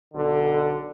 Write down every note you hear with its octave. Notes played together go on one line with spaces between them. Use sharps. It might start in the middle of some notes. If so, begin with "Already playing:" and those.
B1 D3